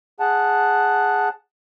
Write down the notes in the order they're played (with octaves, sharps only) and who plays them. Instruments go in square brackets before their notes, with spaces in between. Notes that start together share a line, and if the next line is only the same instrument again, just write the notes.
[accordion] G#4 F#5 A5